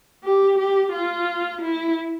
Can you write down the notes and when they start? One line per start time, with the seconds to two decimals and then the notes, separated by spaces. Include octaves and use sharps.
0.24 G4
0.58 G4
0.92 F4
1.61 E4